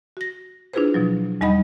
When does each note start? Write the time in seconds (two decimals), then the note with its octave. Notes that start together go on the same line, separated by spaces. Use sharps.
0.17 F#4 A#6
0.73 D4 E4 F4 G#4 B4 C5
0.94 B2 F3 F#3
1.41 E2 G3 D#4 D#5 F#5 B5